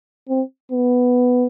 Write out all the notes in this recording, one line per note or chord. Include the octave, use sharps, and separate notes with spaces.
C4
B3